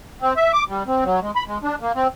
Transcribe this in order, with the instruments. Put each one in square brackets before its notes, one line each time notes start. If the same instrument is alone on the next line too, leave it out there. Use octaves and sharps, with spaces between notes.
[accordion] C4
E5
D6
G3
C4
F#3
G#3
B5
G#3
D4
A#3
C4